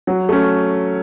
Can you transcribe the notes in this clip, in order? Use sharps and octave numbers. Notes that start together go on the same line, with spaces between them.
F#3
A3 C#4